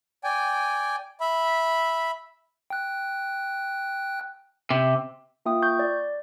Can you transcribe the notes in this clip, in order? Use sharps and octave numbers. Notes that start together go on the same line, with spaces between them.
D5 G5 G#5
E5 B5
G5 F#6
C3
A#3 F4 E5 G5 D#6
C#6 G6
D5